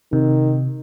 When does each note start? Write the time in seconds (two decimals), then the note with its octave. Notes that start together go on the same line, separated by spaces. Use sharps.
0.13 C3 D#3